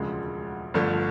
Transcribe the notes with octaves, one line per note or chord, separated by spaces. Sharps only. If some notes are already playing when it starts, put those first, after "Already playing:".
Already playing: E1 D2 C#3 F3 G#3
G1 G2 D3 F3 A3